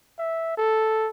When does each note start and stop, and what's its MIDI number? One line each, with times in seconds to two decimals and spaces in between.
0.19 0.53 76
0.57 1.10 69